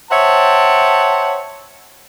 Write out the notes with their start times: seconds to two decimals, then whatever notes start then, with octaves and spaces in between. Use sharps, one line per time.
0.11 C5 C#5 E5 F#5 G5 A5